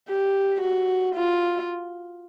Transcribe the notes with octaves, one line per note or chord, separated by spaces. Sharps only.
G4
F#4
F4